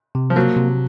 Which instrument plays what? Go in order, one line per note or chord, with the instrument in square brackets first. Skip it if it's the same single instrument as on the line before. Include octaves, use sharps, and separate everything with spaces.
[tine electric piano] C3
[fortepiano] F3
[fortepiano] F#3 [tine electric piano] A#3
[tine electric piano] C3